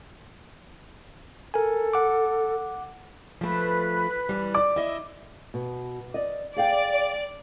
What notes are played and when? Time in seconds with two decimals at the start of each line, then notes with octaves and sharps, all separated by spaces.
1.54 A4 A#4 G#5
1.93 F#5 D6
3.41 F3 A3 B4
4.29 E3 G3
4.54 D5 D6
4.76 E4 D#5 E5
5.54 B2
6.14 D5 D#5
6.56 G#4 D5 F5 G5